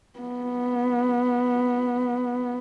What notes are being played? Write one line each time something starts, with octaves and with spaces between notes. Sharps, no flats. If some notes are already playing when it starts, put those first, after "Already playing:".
B3